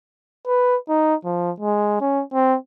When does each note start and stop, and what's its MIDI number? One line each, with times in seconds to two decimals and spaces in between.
0.47 0.77 71
0.89 1.15 63
1.25 1.51 53
1.60 1.96 56
2.00 2.23 61
2.34 2.56 60